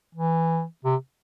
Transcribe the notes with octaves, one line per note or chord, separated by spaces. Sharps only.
E3
C3